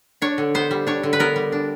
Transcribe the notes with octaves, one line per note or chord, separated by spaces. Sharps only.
D4 C#5
D3
B3 C5
G3
D4 C#5
D3
B4
B3 A#4
G3
D4